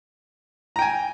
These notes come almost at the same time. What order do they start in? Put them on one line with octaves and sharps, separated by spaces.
A#5 G5 G#5